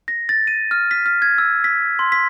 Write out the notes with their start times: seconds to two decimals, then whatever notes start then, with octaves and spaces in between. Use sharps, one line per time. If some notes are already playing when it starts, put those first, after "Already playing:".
0.08 A#6
0.29 A6
0.47 D#7
0.71 F6
0.91 B6
1.06 F6
1.22 G#6
1.38 E6
1.64 B6
1.99 C6
2.12 B6